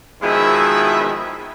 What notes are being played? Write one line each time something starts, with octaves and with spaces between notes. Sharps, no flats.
B2 D#3 F3 G#3 E4 E5